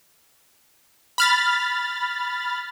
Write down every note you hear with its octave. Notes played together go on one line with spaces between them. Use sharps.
B5 F6 A6